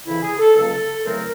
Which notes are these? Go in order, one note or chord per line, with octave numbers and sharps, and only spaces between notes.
F2 C#3 E3 E4
G#4
A4
C#2 C#3 F#3 A#3 A4
E2 C#3 F#3 A3 C4 A#4